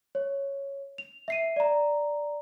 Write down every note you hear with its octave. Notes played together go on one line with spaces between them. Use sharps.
C#5
F7
E5 C7 D#7
D5 A#5